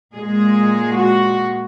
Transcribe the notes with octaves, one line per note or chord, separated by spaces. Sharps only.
A#2 G#3 G#4
F#4